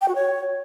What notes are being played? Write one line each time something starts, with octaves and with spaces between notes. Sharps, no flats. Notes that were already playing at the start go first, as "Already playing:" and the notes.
G5
F#4
C#5